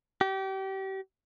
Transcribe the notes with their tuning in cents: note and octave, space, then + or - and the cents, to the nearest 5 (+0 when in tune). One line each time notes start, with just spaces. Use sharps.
G4 -30